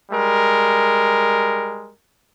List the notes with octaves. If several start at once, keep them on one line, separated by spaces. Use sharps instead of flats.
G3 G#3 A#4